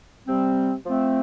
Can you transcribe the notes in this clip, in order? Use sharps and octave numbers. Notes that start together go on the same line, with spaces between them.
C3 G3 C4
F3 A3 C4